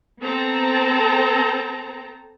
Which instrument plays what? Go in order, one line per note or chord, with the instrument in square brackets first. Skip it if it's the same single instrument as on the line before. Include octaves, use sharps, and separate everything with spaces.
[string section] B3 C4 A4 A#5